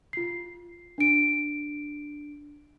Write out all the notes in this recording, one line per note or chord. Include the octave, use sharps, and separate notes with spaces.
F4 C7
D4 D7